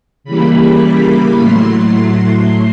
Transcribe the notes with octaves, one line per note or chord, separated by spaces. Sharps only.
C#3 E3 G3 A#3 B5
A2 F#3 A3 C6